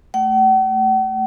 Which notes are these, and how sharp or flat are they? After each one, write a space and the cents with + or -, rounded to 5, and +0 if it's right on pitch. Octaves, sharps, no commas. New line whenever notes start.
A3 +0 F#5 +45